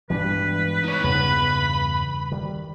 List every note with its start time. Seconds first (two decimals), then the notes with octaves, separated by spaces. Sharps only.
0.10 G2 B2 E3 G3 G#3 D4 B4
0.84 D#4 C#5
1.04 E2 G2 C#3 B3 B5
2.32 D#3 G3